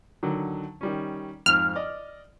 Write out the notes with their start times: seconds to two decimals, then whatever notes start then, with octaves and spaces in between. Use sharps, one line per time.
0.23 D3 D#3 F#3
0.81 D#3 G3 C#4
1.46 F2 G#2 F6
1.75 D5 D#5